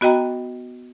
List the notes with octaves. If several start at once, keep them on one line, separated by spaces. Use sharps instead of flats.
B3 F#4 D#5 G5 A#5